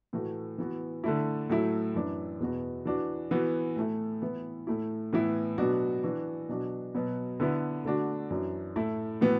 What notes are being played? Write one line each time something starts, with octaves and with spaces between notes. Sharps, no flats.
A2 E3 A3 F#4
E3 B3 F#4
D3 A3 E4
A2 F#3 A3 E4
F#2 E3 D4
E2 B2 B3 F#4
E3 D4 F#4
E3 B3 F#4
A2 A3 E4
E3 B3 E4
A2 A3 E4
A2 E3 B3 E4
B2 F#3 B3 D4 F#4
E3 D4 F#4
B2 F#3 D4 F#4
B2 F#3 B3
D3 B3 E4
D3 A3 D4 F#4
F#2 E3 D4 F#4
A2 A3 E4
A2 E3 B3 F#4